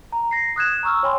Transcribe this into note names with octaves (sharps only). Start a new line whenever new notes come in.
A#5
A#6 C7
D#6 F#6 G#6 E7
A#5 C#6 E6 F6
C#5 G5 G#5 B5 C6